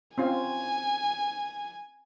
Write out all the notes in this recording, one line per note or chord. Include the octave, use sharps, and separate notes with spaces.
C4 C#4 F4 G#5